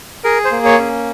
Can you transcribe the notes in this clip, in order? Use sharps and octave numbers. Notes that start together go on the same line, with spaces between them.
G#4 A#4
C5
A#3
C#5
C#4